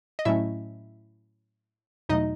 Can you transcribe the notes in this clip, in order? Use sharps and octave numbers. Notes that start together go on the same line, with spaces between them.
D#5
A2 F#3 A3 C#4 E4 E5
E2 B2 F#3 A3 D#4 D#5